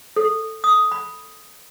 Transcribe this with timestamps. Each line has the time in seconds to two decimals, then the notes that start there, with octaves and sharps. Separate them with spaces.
0.16 A4
0.64 D#6
0.92 B5